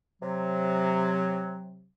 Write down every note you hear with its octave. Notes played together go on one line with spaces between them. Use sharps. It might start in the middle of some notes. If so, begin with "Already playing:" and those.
C3 F#3